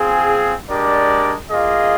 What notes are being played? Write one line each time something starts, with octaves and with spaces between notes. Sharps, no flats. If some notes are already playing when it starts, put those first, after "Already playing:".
Already playing: C4 F4 G#4
G#3 D4 G4 A#4 D5
A#3 F4 G#4 D#5